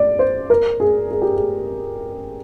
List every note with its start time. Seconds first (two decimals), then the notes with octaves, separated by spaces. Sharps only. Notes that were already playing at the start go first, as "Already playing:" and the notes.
Already playing: D5
0.19 C5
0.50 A#4
0.80 G#4
1.11 G#4
1.22 G4
1.34 G#4